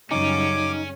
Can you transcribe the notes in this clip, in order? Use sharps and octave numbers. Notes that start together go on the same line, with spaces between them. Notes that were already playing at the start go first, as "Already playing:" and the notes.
F#2 C#3 G3 C#4 D#4 D6